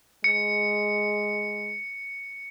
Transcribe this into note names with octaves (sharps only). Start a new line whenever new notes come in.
G#3 C#7